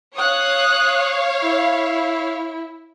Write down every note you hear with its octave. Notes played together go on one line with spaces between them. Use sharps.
C#5 F5 D#6 F#6
E4